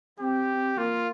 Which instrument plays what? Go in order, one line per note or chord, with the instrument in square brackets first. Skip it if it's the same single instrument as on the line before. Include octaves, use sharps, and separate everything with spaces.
[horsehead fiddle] C4 [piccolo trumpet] G4
[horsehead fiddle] A#3 [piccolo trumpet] F4